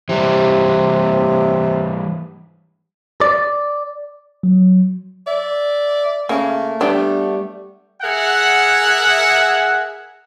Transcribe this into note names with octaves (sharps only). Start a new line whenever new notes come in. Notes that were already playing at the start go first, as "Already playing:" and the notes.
C3 E3 G3
D5
F#3
D5 E5
C#3 A3 A#3 G#5
G3 B3 D4 E5 G5
G#4 A#4 E5 F#5